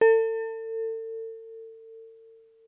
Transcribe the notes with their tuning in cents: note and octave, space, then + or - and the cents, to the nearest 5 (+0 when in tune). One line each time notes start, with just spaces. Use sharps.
A4 +35